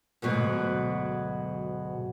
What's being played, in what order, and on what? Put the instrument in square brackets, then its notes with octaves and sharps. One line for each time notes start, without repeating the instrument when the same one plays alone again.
[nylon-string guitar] D2 G#2 B2 F#3